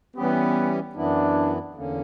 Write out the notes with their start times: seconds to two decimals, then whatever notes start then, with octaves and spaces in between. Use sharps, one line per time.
0.16 E3 G3 B3 C#4 G4
0.95 F#2 E3 B3 D4 E4
1.74 E2 D3 A#3 C#4